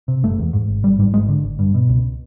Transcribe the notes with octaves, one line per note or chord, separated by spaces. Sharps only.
C3
F#1 A3
E2
G#2
G#1
G#1 G3
G#2 G3
G#1 G#3
D3
G#1
G2
B2
C#2